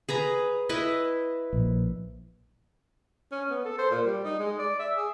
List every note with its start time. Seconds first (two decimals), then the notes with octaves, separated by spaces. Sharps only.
0.09 G#4 B4 A#5
0.69 E4 B4 D#5
1.53 A#1
3.32 C#4
3.50 B3
3.65 A4
3.78 C5
3.91 A#2
4.05 G3
4.25 D#4
4.39 G#3
4.59 D5
4.79 E5
4.96 G#4